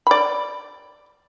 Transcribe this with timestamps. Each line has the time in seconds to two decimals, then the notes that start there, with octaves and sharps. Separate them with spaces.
0.07 D5 B5